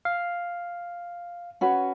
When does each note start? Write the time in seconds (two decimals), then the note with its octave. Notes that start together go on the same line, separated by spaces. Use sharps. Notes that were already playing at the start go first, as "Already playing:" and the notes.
0.05 F5
1.61 C#4 F#4 B4